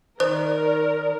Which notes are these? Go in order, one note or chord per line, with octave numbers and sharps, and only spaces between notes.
D#3 A#4 C5 D5